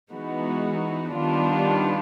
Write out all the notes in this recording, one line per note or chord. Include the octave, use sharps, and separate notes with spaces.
E3 G#3 B3 D#4 F#4
D#3 G3 B3 D4 F4